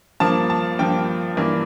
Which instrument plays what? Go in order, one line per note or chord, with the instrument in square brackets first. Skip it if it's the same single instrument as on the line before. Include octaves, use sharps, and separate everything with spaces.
[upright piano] G2 F3 A#3 A5
A5
G2 F3 A#3 G5
G2 E3 A#3 D4